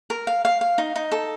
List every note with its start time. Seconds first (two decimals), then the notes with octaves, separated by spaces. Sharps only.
0.10 A#4
0.27 F5
0.45 F5
0.61 F5
0.78 D#4
0.96 D#4
1.12 A4